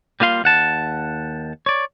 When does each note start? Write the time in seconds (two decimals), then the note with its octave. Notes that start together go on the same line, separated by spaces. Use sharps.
0.20 G3 A#3 F4 F5 C6
0.44 D#2 F#5 A5
1.66 C#5 D5